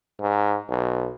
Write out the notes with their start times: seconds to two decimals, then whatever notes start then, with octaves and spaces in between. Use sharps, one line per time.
0.20 G#2
0.69 B1